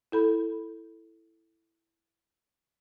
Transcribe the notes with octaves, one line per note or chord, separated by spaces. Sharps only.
E4 A4 B5